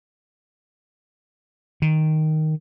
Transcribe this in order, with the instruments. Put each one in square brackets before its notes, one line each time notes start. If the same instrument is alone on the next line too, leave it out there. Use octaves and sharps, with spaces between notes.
[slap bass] D#3